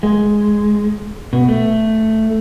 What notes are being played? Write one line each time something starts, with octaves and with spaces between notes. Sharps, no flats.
G#3
B2
A3